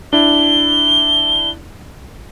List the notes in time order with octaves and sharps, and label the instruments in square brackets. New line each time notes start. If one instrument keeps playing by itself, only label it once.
[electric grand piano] D4 E4 [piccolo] G7